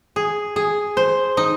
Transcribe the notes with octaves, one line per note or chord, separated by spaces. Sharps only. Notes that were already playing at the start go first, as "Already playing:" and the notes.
G#4
G#4
C5
D#4